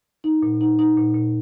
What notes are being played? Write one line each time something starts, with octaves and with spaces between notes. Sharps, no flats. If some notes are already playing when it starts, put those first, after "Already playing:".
D#4
A#2
D#4
D#4
A#2
A#2